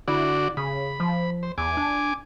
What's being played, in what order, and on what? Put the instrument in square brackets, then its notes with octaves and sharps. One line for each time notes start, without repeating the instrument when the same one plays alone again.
[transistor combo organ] D3 F#4 D5 [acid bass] E4
[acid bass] C#3 [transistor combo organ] B5
[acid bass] F3
[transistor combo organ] C5
[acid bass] E2 [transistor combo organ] G#5 D6
[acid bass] D4